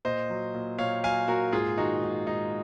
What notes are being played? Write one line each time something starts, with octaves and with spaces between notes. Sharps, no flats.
A#2 C5 D#5
F#3
A#2
A#2 C#5 F5
F#3 F5 G#5
A#2 F#4 A#4
G#2 F4 G#4
D#3 D#4 F#4
G#2
G#2 D#4